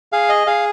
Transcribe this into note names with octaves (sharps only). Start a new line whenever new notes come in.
G#4 F5
D#5
G#4 F5